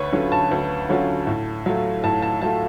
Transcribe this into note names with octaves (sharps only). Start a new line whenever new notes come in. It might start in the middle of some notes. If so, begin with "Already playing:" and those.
Already playing: D2 B4 C#5
D3 F#3 C#4 F4
A5
D2
D3 F#3 C#4 F4
A2
F#3 A3 F4
A2 A5
A5
F#3 A3 F4 A5